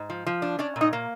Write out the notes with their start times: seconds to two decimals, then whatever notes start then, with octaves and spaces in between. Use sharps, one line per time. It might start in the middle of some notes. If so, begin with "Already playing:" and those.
Already playing: G#2
0.10 F3
0.26 F3
0.42 D4
0.59 C#4 D4 D5
0.76 A#2
0.81 D#4 D#5
0.93 A#3